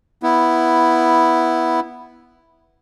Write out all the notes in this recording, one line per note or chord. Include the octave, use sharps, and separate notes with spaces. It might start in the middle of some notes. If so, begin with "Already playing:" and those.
B3 E4